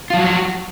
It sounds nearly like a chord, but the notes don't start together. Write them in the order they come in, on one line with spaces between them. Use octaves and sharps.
F4 F3 F#3 F#4